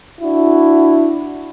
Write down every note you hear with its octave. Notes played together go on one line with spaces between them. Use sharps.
D4 E4 F#4